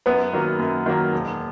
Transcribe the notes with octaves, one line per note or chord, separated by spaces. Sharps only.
F#2 B3 B4
D#3 F#3 A#3
F#2
D#3 F#3 A#3
E1